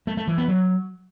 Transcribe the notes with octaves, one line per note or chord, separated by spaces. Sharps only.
A3
A3
E3
B3
F#3